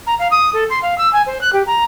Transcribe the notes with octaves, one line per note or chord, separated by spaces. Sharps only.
A#5
F5
D#6
A4
C6
F5
E6
G#5
C5
F#6
G4
A#5